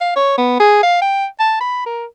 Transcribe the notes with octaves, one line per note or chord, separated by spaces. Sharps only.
F5
C#5
B3
G#4
F5
G5
A5
B5
A#4